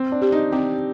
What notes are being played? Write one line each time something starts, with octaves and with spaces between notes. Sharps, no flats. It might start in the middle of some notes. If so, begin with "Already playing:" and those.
Already playing: C4
D4
G4 D5
D#4
C4 G4